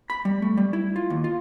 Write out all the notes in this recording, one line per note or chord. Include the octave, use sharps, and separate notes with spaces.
B5
G3
A3
G3
E4
F4
D#2
F4